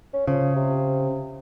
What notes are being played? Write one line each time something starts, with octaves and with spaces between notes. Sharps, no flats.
C#4
C#3 F3
C3